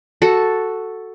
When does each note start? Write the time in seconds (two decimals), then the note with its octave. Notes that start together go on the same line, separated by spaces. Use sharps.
0.22 F#4 A4